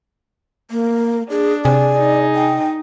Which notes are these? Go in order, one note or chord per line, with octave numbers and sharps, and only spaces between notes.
A#3
D4 G#4
C3 G#4 D5
D#4
G5